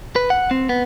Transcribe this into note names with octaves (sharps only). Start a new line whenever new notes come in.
B4
F#5
C4
B3